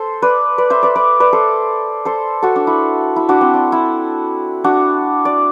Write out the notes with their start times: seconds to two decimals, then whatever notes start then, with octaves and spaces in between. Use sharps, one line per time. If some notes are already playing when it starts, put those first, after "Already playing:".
Already playing: A4 C5
0.22 B4 D5
0.58 B4 D5
0.70 C5 E5
0.83 B4 D5
0.95 B4 D5
1.20 B4 D5
1.33 A4 C5
2.05 A4 C5
2.42 F#4 A4
2.56 D4
2.67 E4
3.16 E4
3.29 D4 F#4
3.41 C4
3.54 D4
3.72 E4
4.64 D4 F#4
5.25 D5